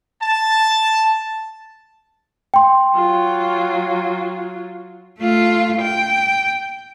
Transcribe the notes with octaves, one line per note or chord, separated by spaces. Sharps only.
A5
G5 C6
F#3 F4
A3 F4
G5